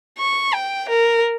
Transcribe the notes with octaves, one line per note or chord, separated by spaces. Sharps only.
C#6
G5
A#4